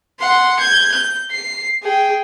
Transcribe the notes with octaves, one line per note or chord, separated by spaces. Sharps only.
F#5 C6
G6 G#6
G6
C7
G#4 G5